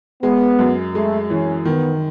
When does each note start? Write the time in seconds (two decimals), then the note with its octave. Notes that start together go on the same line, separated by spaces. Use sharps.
0.23 G#3 B3
0.59 F#2
0.94 G#3 A3
1.30 E3 C#4
1.65 D#3 B3